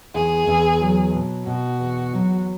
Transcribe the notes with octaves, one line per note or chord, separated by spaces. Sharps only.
E2 G#4
E2
F#3
B2
B2 F#4
E2
F#3